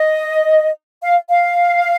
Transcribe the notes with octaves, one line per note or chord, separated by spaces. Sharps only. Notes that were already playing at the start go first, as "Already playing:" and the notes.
Already playing: D#5
F5
F5